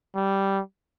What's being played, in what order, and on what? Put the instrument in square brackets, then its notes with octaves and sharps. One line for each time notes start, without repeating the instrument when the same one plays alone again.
[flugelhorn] G3